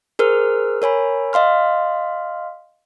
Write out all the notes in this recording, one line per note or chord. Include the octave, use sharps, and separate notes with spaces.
G#4 A#4 C5 F6
A#4 C#5 G#5 B5
D#5 F5 C6 F6